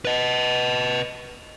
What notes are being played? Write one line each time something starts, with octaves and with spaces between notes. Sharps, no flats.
B4 D#5